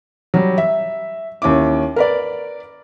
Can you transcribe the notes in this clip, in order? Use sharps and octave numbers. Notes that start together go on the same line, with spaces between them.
F#3 G3
E5
D#2 C#4 E4 D6
A#4 B4 D5